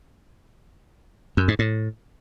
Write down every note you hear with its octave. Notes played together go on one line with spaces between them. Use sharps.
F#2
G#2
A2